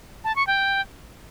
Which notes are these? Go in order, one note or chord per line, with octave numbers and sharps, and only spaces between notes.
A5
C#6
G5